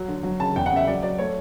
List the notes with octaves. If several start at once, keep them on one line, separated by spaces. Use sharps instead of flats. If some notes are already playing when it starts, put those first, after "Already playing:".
Already playing: F#3
D3
F#3
C#3 A5
E2 G5
F#5
C#3
E5
F#3 D5
F#3 D5
A3 C#5